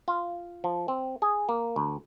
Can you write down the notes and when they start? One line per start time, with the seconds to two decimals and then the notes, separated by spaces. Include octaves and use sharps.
0.08 F4
0.64 F3
0.88 C4
1.22 G#4
1.49 A#3
1.76 D2